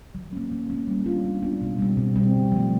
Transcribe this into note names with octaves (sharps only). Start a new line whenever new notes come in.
F#3
A#3 C#4
F#3
A#3 C#4
G3
B3 D4 F4
G3
B3 D4 F4
B2
G3 C4
B2
G3 C4
D3
F3 A3